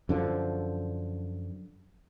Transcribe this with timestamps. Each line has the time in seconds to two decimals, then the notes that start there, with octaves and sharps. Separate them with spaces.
0.09 F#2 D3 F3